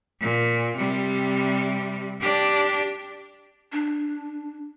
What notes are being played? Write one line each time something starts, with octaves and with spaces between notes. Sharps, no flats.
A#2
C3 G3
D4 G4
D4